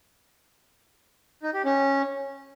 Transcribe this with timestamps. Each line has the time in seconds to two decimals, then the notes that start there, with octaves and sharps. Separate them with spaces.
1.43 D#4
1.54 G4
1.65 C#4